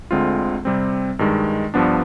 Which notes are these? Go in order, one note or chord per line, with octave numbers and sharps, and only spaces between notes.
D2 D3 G#3 C4 F4
C3 G3 C4
G2 D#3 G#3
G2 F3 B3 D4